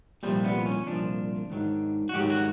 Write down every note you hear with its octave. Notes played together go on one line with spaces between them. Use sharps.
C2 A#2 F3 G3
B3
C#4
C2 A#2 F3 D4
G#2 D#3 F#3
F#4
G#2 D#3 F#3 G4
F#4